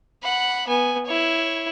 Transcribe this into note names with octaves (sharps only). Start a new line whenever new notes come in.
F#5 B5
B3 G#5
E4 C#5